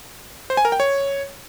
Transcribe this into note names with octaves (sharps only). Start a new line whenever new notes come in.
C5
G#5
A#4
G5
C#5